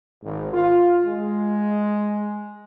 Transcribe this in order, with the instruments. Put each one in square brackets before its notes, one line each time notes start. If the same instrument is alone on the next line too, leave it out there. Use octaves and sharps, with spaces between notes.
[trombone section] G#1
F4
G#3